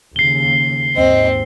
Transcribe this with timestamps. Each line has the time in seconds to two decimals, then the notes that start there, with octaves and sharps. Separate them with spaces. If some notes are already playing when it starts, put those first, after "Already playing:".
0.16 D#2 C#3 C7 G7
0.96 D#2 G#2 C4 D#5